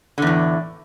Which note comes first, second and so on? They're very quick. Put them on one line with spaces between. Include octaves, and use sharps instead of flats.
D3 E2 A2